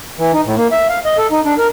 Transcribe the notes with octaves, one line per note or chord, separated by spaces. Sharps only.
E3
D#4
A2
A#3
E5
F5
D#5
A4
D#4
D4
A#4